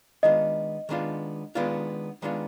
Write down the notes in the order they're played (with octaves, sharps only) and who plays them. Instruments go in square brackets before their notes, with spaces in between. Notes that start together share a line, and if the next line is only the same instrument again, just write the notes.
[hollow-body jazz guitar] D#3 G#3 B3 D4 F4 [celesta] D#5
[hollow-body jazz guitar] D#3 G#3 B3 D4 F4
D#3 G#3 B3 D4 F4
D#3 G#3 B3 D4 F4